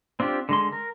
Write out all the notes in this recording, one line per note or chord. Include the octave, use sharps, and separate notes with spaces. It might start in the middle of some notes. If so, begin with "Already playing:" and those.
C4 D4 F4 G4
D3 G#3 C6
A#4